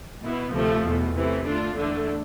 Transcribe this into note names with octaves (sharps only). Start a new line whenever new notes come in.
B2 B3 E4
D2 C3 F3 A3
E2 B2 A3
C3 E3 A3
D3 A3 D4 F4
E2 D3 A3 D4